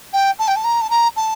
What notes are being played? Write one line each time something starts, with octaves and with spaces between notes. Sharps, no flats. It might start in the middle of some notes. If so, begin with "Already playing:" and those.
G5
A5
G5
A5
A#5
A5
A#5
A5